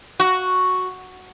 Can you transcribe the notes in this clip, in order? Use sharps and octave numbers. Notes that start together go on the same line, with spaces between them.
F#4